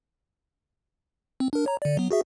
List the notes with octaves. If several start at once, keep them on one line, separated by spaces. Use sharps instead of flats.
C4
D4 A#4
C#5 A#5
D3 D5
F#3 B3
F#4 G#4 E5